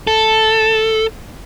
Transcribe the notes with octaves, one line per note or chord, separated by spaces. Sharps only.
A4